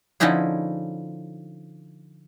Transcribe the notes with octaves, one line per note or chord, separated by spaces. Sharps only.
D3 F3 C#4 D#4 E4 G#4